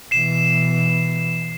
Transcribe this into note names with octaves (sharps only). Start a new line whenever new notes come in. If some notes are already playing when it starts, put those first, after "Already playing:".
B2 E3 C7 E7